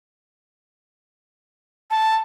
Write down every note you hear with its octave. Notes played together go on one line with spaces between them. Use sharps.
A5